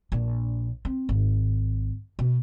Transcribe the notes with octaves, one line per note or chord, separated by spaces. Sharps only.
A#1 D4
C4
G#1
B2